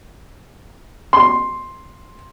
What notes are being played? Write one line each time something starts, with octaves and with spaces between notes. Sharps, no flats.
C6